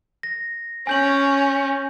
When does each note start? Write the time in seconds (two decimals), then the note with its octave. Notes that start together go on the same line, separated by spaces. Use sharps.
0.23 A#6
0.87 C#4 G#5 G6 F#7